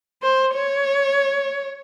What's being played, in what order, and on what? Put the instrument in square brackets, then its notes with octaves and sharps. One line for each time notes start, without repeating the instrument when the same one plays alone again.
[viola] C5
C#5